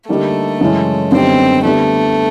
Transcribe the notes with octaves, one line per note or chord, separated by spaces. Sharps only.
D3 G3 A3 A#3 D#4 G4
F#2 C#3 E3 G#3 C#4
F#2 D3 G3 B3 C4 D#4
D3 G3 A3 B3